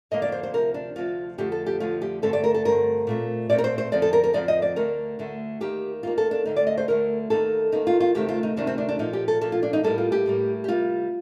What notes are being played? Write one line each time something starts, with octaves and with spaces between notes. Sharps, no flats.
F2 D3 F3 A#3 D#5
D5
C5
C5
D2 C3 F3 C4 A#4
D4
D2 C3 F3 C4 F4
F2 D3 F3 A3 G4
A4
G4
F2 D3 F3 A3 F4
G4
G2 D3 A3 C4 A4
D5
A#4
A4
G2 D3 A3 C4 A#4
A#2 A3 C4
A#2 A3 C4 D5
A#4
C5
C5
F2 D3 F3 C4 D5
A4
A#4
A#4
F2 D3 F3 C4 D5
D#5
D5
D2 D3 A3 A#4
D2 D3 A3
D#2 D#3 A#3 G4
D#2 D#3 A#3 F4
A4
D4
D2 D3 A3 D#4
D5
D#5
C5
D2 D3 A3 A#4
D#2 D#3 A#3 A4
D#2 D#3 A#3 D#4
F4
F4
D2 C3 D#3 A3 C4 G4
F4
D#4
D2 C3 D#3 A3 C4 D4
C4
D4
D4
A#2 F3 A#3 D#4
G4
A4
A#2 F3 A#3 A4
F4
D4
D#4
A2 G3 A#3 A4
F4
G4
A2 G3 A#3
G4
C3 G3 A#3 F4